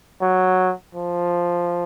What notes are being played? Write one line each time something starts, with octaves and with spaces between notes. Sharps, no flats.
F#3
F3